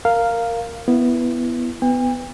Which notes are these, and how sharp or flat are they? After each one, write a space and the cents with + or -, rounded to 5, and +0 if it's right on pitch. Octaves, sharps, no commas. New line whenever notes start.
A#4 -10 F5 +0
B3 +0 E4 +10
B3 +20 G5 +45